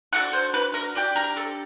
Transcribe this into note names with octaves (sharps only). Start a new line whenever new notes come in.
D4 F#4 A4 F#5
C5
B4
A#4
D4 G4
A#4
A4